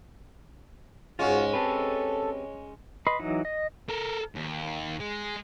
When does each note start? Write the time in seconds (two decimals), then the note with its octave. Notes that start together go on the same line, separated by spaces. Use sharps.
1.19 G#2 G#3 C#4 F4 F#4
1.53 C4 G4 A4 B4
3.07 B4 D#5 B5 C6
3.19 E3 F#3 D#4
3.45 D#5
3.89 A4 A#4
4.35 D#2
5.00 G#3